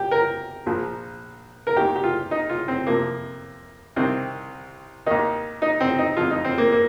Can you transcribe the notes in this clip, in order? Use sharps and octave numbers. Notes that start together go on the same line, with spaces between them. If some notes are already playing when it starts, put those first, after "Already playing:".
Already playing: G4
A#4
A#1 A#2 F3
A#4
D#2 D#3 G4
G4
F4
D#4
F4
C4
F2 C3 F3 A#3
C2 C3 D#3 C4
D#2 D#3 D#4
D#4
C4
D#4
F2 F3 F4
D#4
C4
A#3
A#3